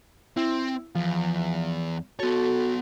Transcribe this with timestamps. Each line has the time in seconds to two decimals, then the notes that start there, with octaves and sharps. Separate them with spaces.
0.37 C4 E4
0.95 E2 F3
2.20 B3 F#4 A4 C#5